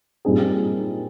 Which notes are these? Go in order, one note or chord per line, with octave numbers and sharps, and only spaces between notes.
A#2 G3 C4 D#4 G#4